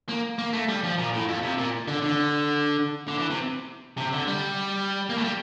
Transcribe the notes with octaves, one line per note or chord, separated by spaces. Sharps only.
A#3
A#3
A3
G3
F3
A#2
A2
F2
C3
A#2
D3
D3
D3
E3
C3
C3
D3
G3
A#3
A3
G3